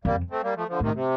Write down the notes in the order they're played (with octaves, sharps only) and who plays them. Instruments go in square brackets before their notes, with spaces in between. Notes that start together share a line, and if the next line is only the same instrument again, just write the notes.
[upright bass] F2 [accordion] G3 A#3
[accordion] A3 C4
G3 A#3
F3 A3
D3 F3
[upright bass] A2 [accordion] C3 D#3
[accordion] C3